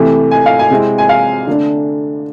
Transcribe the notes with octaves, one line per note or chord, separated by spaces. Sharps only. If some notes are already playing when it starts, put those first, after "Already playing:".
Already playing: C3 E3 A3
G#5
F5
G#5
C3 G#3 C4 E4
G#5
F5
D3 A3 D4